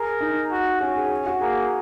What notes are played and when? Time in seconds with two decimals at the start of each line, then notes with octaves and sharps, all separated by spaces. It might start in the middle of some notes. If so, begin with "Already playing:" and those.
Already playing: G#4 A#4
0.21 D#4
0.51 F#4
0.81 C#4 F#4
0.96 G#4
1.26 F#4
1.41 A#3 G#4